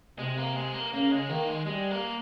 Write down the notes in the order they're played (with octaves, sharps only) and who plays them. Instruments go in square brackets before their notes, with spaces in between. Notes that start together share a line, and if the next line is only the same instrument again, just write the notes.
[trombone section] C3 [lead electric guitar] G#3
[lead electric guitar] A#3
G#3
A#3
[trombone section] C#3 [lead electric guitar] A#3
[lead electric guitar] G#3
[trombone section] D#3 [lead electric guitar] A#3
[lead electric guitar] G#3
[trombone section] G3 [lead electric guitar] G#3
[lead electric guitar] A#3